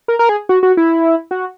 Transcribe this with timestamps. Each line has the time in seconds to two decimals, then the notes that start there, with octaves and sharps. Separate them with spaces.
0.08 A#4
0.19 A#4
0.29 G#4
0.49 F#4
0.63 F#4
0.77 E4
1.31 F#4